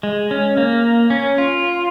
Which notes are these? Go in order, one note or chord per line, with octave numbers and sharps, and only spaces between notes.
G#3
C#4
A#3
C#4
F4